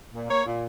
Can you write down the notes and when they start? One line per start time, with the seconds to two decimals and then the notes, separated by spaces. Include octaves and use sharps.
0.13 A#2
0.30 A#3 C#5
0.46 A#2